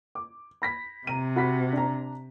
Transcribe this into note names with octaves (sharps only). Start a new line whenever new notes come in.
D6
B5 A#6 B6
C3 A#5 D#7
F#4 B5 B6
D4 A#5